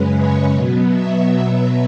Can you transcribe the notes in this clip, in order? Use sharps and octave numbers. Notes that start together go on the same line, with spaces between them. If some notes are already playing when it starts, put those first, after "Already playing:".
Already playing: F#2 C#3 G#3 C#4 B4
C#5
B2 F#3 B3
E5